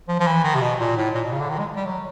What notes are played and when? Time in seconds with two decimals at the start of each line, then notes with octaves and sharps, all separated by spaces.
0.08 F3
0.20 F3
0.27 E3
0.44 D#3
0.55 C3
0.61 B2
0.79 A#2
0.97 A2
1.14 A#2
1.24 B2
1.32 C#3
1.40 D3
1.49 D#3
1.59 G#3
1.76 G3
1.85 F#3